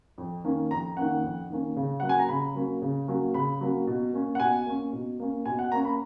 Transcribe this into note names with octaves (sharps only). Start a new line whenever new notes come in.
F2
D#3 A#3 C#4
F2 A#5
D#3 A#3 C#4 F#5
F2
D#3 A#3 C#4
C#3
F#3 A#3 C#4 F#5
G#5
A#5
C#3 B5
F#3 A#3 C#4
C#3
F#3 A#3 C#4
C#3 B5
F#3 A#3 C#4
B2
A#3 C#4
F#5
B2 G#5
A#3 C#4
B2
A#3 C#4
B2 G#5
F#5
A#3 C#4 A#5
B5